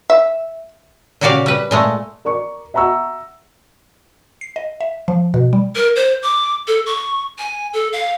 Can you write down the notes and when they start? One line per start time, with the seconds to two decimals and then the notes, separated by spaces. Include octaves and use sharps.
0.10 E5
1.21 A#2 C#3 F#4 G4 D5 F5
1.46 G3 B4
1.71 A#2 G#3 A3
2.25 A#4 D5 C#6
2.74 E5 F#5 A#5 C#6 E6
4.41 C7
4.56 D#5
4.81 E5
5.08 F3
5.34 B2
5.53 G3
5.75 A#4
5.96 C5
6.22 D6
6.67 A4
6.86 C#6
7.38 G#5
7.73 A4
7.92 F5